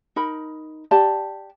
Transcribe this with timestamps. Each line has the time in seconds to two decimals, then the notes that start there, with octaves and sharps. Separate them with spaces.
0.16 D#4 A#4 B5
0.91 G4 D5 A5